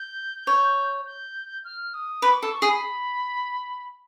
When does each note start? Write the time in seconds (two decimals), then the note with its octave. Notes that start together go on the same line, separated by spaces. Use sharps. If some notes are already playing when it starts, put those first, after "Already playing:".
Already playing: G6
0.47 C#5
1.06 G6
1.64 F6
1.94 D#6
2.22 B4 D6
2.33 C#6
2.38 A4 D6
2.52 C#6
2.62 G#4
2.67 B5